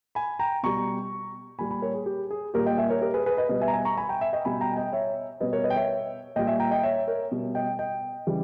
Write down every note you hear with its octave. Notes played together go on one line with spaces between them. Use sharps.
G#5 B5
G5 A#5
B2 G3 A#5 C#6
A#2 G3 G#5 B5
G#5 B5
A#4 C#5
G#4
G4
G#4
A#2 G3 G4 A#4
D#5 G5
E5 G#5
A#4 C#5
G4 A#4
G#4 B4
G#4 B4
B4 D#5
B2 G3 B4 D#5
E5 G#5
A#5
E5 G#5
A#5 C#6
G#5 B5
G5 A#5
E5 G#5
D#5 G5
B2 G3 G#5 B5
G5 A#5
G#5
D#5 G5
C#5 E5
B2 G3 B4 D#5
A#4 C#5
B4 D#5
G5
C#5 E5
A#2 G3 D#5 G5
E5 G#5
G5 A#5
D#5 G5
C#5 E5
A#4 C#5
B2 G3
D#5 G5
D#5 G5
C#3 E3 G3